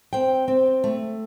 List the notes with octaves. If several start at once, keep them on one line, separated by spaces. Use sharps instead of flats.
C4 G5
C4
A3